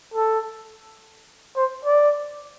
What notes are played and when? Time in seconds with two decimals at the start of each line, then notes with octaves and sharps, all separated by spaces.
0.14 A4
1.56 C5
1.85 D5